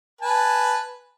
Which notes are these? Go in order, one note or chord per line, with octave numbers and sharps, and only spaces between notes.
B4 G#5 A5